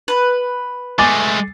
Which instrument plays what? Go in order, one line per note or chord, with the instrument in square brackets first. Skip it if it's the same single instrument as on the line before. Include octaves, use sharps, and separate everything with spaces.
[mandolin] B4
[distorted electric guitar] G#3 A3 [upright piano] G#5 D6 A6